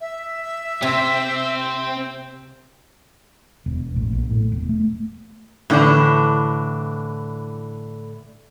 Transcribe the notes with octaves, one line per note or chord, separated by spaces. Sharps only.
E5
C3 C4 C5
E1
A1
A#1
A2
E1
A3
A2 D3 E3 D4